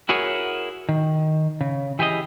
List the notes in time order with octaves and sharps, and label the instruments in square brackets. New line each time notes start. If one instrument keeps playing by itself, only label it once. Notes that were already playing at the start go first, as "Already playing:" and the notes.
[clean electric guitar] E4 F#4 G#4 A#4 C#5
D#3
C#3
E3 G4 G#4 B4 D#5